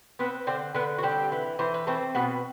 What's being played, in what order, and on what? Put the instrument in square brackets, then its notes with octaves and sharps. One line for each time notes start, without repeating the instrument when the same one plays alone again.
[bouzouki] B3 C4 B4
D3 C4 C5
D3 B3 B4
F#4
G3 C4 G4
E3
E3 C5
B4
A3 C4 A4
B2 B3 B4